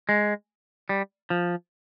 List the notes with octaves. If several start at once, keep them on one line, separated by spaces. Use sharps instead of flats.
G#3
G3
F3